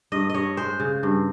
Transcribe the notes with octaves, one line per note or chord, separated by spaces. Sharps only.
G2 D#5
G2 C#5 D#5
G#3 C5
C#3
G2